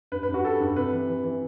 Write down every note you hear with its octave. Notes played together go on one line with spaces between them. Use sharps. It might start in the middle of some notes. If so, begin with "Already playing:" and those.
G2 B4
B4
G2
F#4
G3 A4
G2
C3 B4
E3
E3
E3